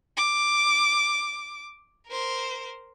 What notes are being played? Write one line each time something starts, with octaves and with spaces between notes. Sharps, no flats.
D6
A#4 C5